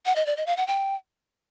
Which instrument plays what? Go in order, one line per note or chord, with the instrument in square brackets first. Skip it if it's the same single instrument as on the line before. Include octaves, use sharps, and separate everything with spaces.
[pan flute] F#5
D#5
D5
D#5
F5
F#5
G5